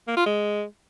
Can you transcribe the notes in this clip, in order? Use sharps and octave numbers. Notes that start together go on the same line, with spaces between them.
A#3
F4
G#3